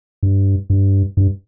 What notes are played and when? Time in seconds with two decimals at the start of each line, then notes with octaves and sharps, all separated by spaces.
0.23 G2
0.70 G2
1.17 G2